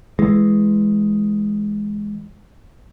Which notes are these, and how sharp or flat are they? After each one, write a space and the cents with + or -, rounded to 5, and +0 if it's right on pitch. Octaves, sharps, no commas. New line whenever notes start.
E3 +0 G#3 +0